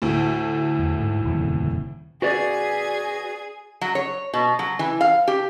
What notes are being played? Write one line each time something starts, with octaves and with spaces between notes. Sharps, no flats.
D2 A2
E2
G#2
D#1 F2 C#3
F#4 G#4 B4 D5 G#6
F#3
C#5
B2
F#3
E3
F5
G4